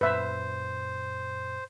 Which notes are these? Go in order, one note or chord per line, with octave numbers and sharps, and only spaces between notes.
F#2 A#2 B4 C5 E5